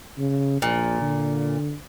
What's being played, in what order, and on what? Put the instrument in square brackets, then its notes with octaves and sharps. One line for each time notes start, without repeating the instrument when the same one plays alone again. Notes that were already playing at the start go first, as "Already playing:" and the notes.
[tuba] C#3
[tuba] A#1 [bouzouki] A#2
[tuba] D3